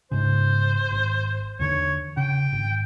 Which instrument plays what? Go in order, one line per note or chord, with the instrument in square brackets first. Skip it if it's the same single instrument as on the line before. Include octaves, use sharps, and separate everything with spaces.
[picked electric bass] G#2 C#3 [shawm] C5
[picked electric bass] G#1
[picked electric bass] E2 D3 [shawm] C#5
[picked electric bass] C#3 [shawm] G5
[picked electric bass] G#1